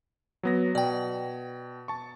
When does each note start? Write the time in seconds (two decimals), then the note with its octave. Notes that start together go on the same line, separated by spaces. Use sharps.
0.43 F#3 B3 A#6
0.75 B2 D5 G5
1.88 A5 C#6